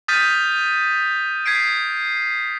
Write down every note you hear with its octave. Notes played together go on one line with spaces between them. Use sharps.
D#6 F6 G6 A6 B6 D#7
G#6 B6 C7 D7